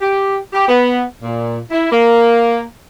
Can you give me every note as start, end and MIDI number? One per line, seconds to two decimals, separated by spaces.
0.01 0.36 67
0.53 0.67 67
0.69 1.02 59
1.23 1.58 46
1.71 1.88 64
1.91 2.62 58